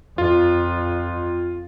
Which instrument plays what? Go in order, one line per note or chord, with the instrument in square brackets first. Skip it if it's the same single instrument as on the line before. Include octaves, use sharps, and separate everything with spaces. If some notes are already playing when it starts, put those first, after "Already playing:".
[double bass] F2 [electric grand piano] F4